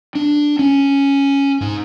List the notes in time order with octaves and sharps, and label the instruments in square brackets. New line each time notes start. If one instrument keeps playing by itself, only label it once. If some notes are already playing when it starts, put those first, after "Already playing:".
[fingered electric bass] D4
C#4
G#2